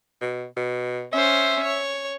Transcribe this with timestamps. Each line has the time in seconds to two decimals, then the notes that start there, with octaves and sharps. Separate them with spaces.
0.21 B2
0.56 B2
1.13 C#4 C5 E5
1.64 C#5